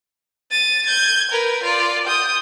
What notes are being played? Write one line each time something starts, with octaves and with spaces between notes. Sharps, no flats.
A6 D#7
G6 G#6
A#4 B4
F4 D5
D#6 G6